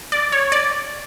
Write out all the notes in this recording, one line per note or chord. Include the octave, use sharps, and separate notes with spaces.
D5
C#5
D5